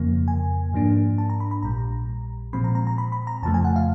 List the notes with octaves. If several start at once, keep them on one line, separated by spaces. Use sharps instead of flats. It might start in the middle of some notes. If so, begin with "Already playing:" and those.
Already playing: F2 C#3 F3 A#3
G#5
G#2 F3 A#3 D4
A5
A#5
B5
B5
A#1 A#2 G3 A#5
A#2 F3 G#3 C4 B5
A#5
A#5
A#5
B5
B5
A#5
F2 C#3 F3 A3 A5
G#5
F#5
F5